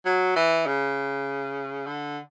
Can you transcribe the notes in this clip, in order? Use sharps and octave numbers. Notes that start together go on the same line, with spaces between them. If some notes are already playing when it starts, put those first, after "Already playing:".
F#3
E3
C#3
D3